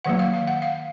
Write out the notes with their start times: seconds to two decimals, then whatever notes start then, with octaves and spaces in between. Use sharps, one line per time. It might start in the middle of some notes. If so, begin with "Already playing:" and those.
0.05 D#3 F#3 A#3 F#5
0.19 F5
0.34 F5
0.47 F#5
0.62 F5